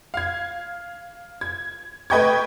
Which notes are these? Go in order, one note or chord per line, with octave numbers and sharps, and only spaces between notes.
F5 G#6
G#6
A3 B4 D#5 G5 C#6 G#6